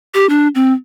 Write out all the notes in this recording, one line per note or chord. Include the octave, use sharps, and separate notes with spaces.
G4
D4
C4